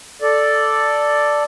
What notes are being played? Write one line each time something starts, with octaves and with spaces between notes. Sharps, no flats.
A4 D5